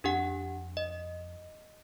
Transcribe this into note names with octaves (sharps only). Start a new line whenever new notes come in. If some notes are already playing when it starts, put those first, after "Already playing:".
F2 D4 G4 F#5
D#5